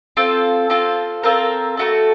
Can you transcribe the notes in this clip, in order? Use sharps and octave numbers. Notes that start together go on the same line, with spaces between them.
C4 F4 A4
C4 F4 A4
C4 F4 A4 A#4
A3 D4 F#4 A4